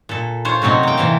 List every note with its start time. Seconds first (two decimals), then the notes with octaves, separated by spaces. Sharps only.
0.09 A#2 A4
0.45 F4 C5 C#5
0.62 C3 F#3 C4 C#4 D#4
0.83 A#3 G5
0.98 C3 E3 E4 F5